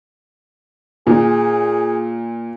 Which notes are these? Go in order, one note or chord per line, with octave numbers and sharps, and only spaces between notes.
A#2 G#4